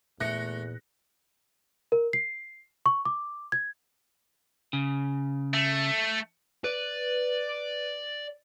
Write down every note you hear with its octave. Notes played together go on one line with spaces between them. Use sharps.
E2 A#2 A3 F#6 A#6 C#7
A#4
C7
C#6
D6
G#6
C#3
A3
B4 D5